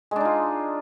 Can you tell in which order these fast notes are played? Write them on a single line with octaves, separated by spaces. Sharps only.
G#3 D4 D#4 F4